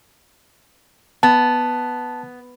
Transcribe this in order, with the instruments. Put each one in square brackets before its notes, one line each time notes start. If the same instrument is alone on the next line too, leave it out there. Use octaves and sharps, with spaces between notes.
[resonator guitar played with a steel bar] B3 [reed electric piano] A5